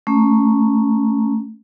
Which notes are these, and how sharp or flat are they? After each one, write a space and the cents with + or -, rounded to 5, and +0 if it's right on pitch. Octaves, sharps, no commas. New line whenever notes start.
A3 +0 C#4 +0 A#5 +0